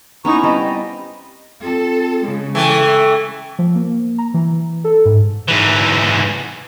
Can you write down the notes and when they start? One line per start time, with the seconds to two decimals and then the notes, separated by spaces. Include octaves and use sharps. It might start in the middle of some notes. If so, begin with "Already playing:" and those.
0.25 B3 C#4 D#4 E4 A#5 C#6
0.43 G3 C4 D#5
1.63 C4 F4 A4
2.21 C#3 G#3
2.55 E3 A3 G5 C#6
3.59 F3
3.75 A#3
4.18 A#5
4.34 E3
4.84 A4
5.05 G#2
5.48 G#2 E3